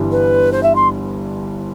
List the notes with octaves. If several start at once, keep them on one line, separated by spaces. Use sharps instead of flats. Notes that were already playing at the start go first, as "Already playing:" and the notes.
Already playing: G1 G2 E3 G3
B4
C5
E5
C6